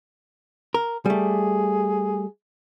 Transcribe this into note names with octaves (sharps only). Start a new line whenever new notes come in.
A#4
G3 A3 G#4